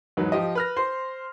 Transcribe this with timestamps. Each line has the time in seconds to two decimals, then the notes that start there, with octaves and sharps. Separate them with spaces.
0.17 E2 G#2 F#3 D#4 B4
0.32 F3 G4 D#5
0.55 B4 F6 A#6
0.76 C5 C6